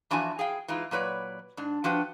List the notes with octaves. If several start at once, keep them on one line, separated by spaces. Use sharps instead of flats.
E3 F3 D4 F#4 E5 G#5
G#4 F5 G5
E3 G#3 D#4 F4
A#2 F#3 B4 C#5 D5
G#2 D4
F3 D4 F#4 B4 G5